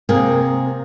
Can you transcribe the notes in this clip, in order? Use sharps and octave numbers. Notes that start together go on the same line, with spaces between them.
C3 A#3 G#4